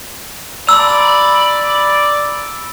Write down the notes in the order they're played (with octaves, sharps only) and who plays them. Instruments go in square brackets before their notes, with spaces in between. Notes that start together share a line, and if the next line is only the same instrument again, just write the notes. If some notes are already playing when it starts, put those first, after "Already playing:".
[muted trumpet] D5 [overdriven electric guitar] A#5 B5 [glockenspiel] E6